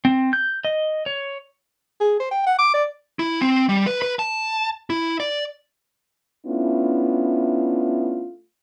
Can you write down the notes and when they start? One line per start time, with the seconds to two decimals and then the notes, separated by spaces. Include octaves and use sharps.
0.05 C4
0.33 G6
0.65 D#5
1.06 C#5
2.00 G#4
2.20 C5
2.31 G5
2.46 F#5
2.58 D6
2.74 D5
3.19 E4
3.42 C4
3.69 G3
3.87 B4
4.02 B4
4.19 A5
4.90 E4
5.20 D5
6.47 A3 B3 C#4 D4 E4 F4